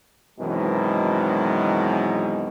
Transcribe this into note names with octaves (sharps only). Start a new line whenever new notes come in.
F#2 B2 D#3 E3 G#3 C4